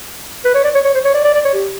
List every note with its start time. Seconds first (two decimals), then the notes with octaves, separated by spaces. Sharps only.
0.45 B4
0.55 C#5
0.64 D5
0.75 C#5
0.85 C#5
0.94 C5
1.05 C#5
1.14 D5
1.24 D5
1.34 D5
1.45 C#5
1.54 G4